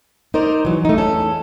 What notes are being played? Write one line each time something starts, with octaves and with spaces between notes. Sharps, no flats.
D#4 A#4 C5 D5
E3 F#3
A3 D#4
E2 C#4 A4